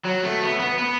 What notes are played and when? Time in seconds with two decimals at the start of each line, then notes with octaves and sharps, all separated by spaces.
0.05 F#3
0.24 A3
0.42 B3
0.60 B3
0.78 B3